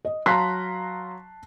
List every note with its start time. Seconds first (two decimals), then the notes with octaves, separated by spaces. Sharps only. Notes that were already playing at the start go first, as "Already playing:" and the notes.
0.05 D#5
0.26 F#3 F5 A5 A#5 C6 F#6 B6